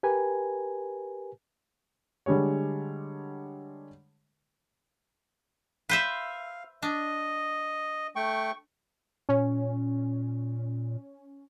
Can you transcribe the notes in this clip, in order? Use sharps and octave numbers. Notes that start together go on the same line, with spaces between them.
G4 A#4 B4 G#5
D3 G3 G#3 C#5
B4 C5 E5 F5
D4 D#5
A3 G5 C#6
A#2 C#4